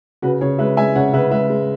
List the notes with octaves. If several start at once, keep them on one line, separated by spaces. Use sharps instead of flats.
C#3 F#4 B4
C#3 G#4 C#5
G#3 B4 E5
G#3 E5 G#5
C#3 C#5 F#5
C#3 B4 E5
G#3 B4 E5
G#3